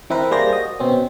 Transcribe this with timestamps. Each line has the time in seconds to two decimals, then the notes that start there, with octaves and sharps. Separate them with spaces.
0.10 E3 C4 E4 A#4 B4
0.31 G3 A#3 G#4 C5 D5 A#6
0.53 F#4 D#5
0.79 B2 C4 C#4